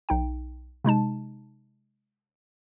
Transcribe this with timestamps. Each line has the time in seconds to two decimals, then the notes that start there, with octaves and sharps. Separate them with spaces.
0.09 B1 D#4 G5
0.84 C3 G#3 D#4 A5